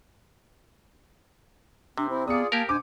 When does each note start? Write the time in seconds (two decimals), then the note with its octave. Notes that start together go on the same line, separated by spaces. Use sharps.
1.98 C3 C4 D4
2.09 C4 E4 C5
2.28 B3 F4 G#4 D5 D#6 C#7
2.52 A#3 G4 A#4 F5 G#5 A5
2.69 B2 D4 C5 G#5 D6